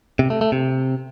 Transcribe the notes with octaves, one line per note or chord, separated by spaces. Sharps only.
C3
A3
A3
C3